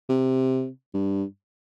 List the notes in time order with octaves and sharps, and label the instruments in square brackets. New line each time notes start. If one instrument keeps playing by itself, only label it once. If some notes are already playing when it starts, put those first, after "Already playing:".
[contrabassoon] C3
G2